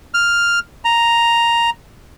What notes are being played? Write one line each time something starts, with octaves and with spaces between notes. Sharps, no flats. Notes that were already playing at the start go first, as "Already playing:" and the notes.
F6
A#5